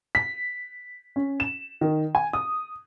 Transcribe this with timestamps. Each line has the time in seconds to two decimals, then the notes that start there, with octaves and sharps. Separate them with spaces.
0.15 B6
1.16 C#4
1.40 E7
1.81 D#3
2.15 G#5
2.33 D#6